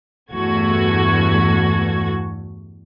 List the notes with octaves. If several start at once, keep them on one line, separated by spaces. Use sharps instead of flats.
E2 G2 A3 F#4 G#6